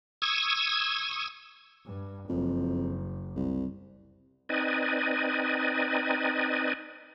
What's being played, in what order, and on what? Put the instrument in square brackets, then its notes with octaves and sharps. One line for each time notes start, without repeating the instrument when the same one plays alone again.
[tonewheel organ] C#6 D#6 E6 G#6
[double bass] G2
[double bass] F#1 [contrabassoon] F2
[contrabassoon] C2
[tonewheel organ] C4 D#4 B4 D5 D#5 G#5